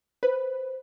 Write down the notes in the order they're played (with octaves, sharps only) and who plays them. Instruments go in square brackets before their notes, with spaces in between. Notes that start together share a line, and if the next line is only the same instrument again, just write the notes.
[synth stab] B4 [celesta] C5